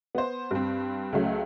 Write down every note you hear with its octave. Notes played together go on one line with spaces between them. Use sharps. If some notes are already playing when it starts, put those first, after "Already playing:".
B3 C5
G2 C4
C#2 C#3 F#3 A3